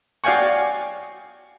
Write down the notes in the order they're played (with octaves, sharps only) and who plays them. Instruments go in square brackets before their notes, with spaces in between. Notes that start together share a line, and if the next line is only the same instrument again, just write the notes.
[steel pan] F#4 D5 F5 G5 G#5 C#6